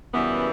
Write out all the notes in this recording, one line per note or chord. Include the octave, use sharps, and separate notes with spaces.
F#2 C#3 E3 G3 B3